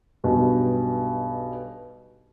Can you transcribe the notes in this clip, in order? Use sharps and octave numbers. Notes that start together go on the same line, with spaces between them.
B1 G2 B2